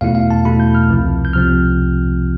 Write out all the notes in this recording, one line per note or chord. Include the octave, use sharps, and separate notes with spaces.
E2 B2 A3 E4 F5
F5
A5
E2 B2 A3 E4 B5
G6
F6
C2 C3 F3 C4
G6
C2 C3 F3 C4 F6